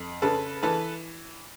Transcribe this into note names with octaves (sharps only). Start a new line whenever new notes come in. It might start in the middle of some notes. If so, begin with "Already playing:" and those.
Already playing: F2
C#3 A4 B4
E3 A4 B4